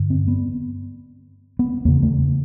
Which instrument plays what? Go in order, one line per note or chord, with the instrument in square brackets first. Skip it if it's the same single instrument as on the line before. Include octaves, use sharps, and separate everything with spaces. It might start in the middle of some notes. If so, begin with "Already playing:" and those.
Already playing: [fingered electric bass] G2 D3
C4
B3
B3
E2 A#3
C#3
A3